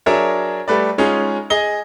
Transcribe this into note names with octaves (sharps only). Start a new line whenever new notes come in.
F#3 D4 G#4 A#4 C#5 E5
G3 A3 B4 D5
G#3 C#4 D#4 F4 G#4
G#4 D#5 G7